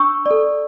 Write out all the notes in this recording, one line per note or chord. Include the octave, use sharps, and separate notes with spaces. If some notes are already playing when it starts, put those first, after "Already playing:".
Already playing: D4 C#6 E6
A4 D5